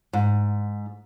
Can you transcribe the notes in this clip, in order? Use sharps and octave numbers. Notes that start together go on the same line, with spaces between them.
G#2